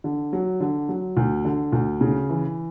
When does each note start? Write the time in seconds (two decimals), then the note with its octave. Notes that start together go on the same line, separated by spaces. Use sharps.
0.04 D3
0.33 F#3
0.60 D3
0.89 F#3
1.17 D2
1.45 D3
1.72 D2
2.01 C#3
2.29 E3